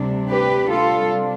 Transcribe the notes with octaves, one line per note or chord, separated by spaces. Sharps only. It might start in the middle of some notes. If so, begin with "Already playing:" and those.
Already playing: D2 C3 G3 D4
G4 B4
C3 G3 D4 F4 A4